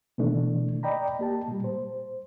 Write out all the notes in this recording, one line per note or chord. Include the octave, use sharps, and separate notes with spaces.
B2 D#3 E3 A3 D4
D5 D#5 G5 A#5 B5
A#3 G4 A5
A#2 G3
C5